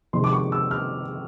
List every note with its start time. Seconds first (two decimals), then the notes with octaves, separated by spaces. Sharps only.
0.13 F2 C3 D#3 G#3 C6
0.24 D6
0.33 C#6
0.52 E6
0.71 F6